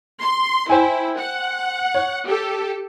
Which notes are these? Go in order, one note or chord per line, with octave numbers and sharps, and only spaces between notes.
C6
E4 C5 G5 G#5
F#5
C#5
G4 A4